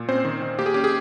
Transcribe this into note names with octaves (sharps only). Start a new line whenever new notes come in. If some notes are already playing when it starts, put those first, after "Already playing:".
Already playing: A#2
C4 C#4 C5
D#3
D#3
A#3 G4
G#4
C#4 G4
G#4